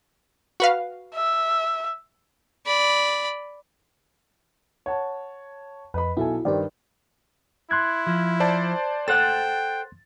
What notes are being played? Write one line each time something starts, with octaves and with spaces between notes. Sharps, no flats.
F#4 B4 F5
E5
D5 B5
C#5 F#5 A5
F2 B4 D#5 B5
B1 E4 F#4 A4 G#5
G2 D#3 G4 C5 D5
E4 C6 F#6 G#6
F3
C5 D5 A5
A4 C5 F#5 G5 A6